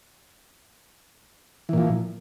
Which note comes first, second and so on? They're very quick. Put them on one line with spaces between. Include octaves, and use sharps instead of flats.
E3 A#2 F3